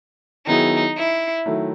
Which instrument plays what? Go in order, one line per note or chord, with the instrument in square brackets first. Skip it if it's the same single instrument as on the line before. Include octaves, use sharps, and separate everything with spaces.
[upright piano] D#3 F#3 B3 E4 G#4 [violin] D#4
[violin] E4
[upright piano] D#3 F#3 A3 E4